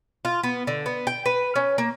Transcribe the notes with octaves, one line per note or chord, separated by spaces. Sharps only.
F4
B3
D3
B3
G5
B4
C#4
A#3